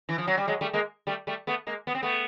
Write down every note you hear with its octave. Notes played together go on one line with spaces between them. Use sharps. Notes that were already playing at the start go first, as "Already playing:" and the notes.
E3
F3
F#3
G3
F#3 G#3
G3 A3
G#3 A#3
G3 A3
G3 A3
A3 B3
G#3 A#3
B3
C4
A3 B3